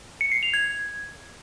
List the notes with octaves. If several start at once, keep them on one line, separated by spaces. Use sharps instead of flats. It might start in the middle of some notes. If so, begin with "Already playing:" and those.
C#7
C7
F7
G#6